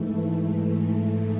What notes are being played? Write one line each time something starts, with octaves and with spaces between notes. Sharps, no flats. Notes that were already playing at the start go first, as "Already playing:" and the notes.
Already playing: G#2 E3 A3